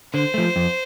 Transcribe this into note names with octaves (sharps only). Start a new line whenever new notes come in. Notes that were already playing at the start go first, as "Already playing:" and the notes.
D3 C5
F3 A3
F2